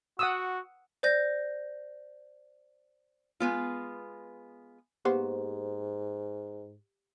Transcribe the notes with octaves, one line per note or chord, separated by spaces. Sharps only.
F#4 F#5 D#6 E6
C5 D5 G6 A#6
G#3 B3 F4
G#2 A#3 B3 G4 C5